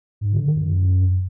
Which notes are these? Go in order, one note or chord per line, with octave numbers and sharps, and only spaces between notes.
G#2
D3
D#3
F#2